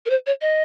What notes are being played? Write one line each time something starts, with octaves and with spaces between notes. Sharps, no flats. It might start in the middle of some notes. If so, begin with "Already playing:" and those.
A#4
C5
C#5
D#5